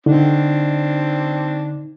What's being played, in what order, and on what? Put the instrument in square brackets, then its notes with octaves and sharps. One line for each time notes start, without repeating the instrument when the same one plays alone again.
[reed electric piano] D3 [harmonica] C4 D4 [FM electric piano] D#4